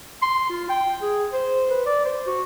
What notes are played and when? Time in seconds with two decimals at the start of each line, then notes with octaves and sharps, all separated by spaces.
0.22 C6
0.50 F4
0.69 G5
1.02 G#4
1.32 C5
1.70 B4
1.86 D5
2.05 C5
2.27 F#4